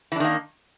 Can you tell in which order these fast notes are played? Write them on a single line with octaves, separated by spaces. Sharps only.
E3 D4 D#3 A#3